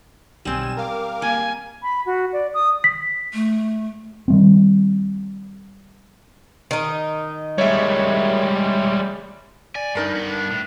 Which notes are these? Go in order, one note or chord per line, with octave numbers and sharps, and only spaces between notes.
B1 G3 C4 G#5 E7
A#4 F5 D6
A#3 G#5
B5
F#4
D5
D#6
B6
A3
D#3 G3 C4
D#3 D#4
G3 G#3 C#5 E5
D5 G#5
G2 D#4 A#4 B4 A5
G2 B3
D4
A2